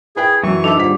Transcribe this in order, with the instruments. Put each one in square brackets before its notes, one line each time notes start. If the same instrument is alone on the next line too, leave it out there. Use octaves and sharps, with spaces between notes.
[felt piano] E4 B4 G5 [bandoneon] G#4
[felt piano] F#2 F#3 [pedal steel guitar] E3 [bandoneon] C#6
[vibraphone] D4 [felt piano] D#4 B4 E5 [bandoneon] A4
[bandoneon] D#2 G#2 [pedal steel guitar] G3 [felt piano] F4 B6